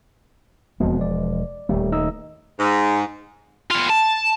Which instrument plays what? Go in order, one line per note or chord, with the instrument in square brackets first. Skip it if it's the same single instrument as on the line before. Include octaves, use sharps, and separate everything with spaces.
[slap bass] E1 F3 G#3 [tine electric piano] F2 B2
[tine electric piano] D5
[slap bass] D#1 D#3 A3 [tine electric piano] G3
[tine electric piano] D#4 D#5 E6
[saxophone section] G#2
[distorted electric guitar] B3 F4
A5